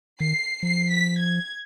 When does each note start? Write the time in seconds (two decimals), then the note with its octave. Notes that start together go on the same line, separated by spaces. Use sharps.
0.20 D#3 C7
0.63 F3 C7
0.91 B6
1.19 G#6